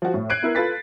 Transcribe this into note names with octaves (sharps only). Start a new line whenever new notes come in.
F3 F#4
A2
F#6 G#6 C7 D7 D#7
B3 E4 A#4
F4 A4 B4 A6 B6